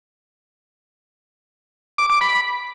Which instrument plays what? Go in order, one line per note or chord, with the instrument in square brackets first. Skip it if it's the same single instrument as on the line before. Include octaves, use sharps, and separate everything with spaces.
[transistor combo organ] D6
D6
B5